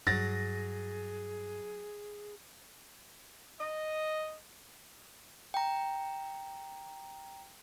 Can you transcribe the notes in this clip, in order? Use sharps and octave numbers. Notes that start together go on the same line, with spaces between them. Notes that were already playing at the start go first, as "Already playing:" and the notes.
G2 F#3 G#4 A6 A#6
D#5
G5 A#5